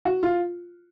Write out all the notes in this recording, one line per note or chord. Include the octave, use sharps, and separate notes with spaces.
F#4
F4